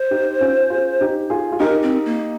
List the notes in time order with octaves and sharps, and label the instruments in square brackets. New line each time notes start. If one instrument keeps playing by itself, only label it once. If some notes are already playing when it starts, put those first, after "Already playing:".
Already playing: [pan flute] C5
[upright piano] D#4 G4
C#4 F4
F4 G#4
D#4 G4
F4 G#4
F4
[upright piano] D#4 G4 [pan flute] A#4
[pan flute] C4
A#3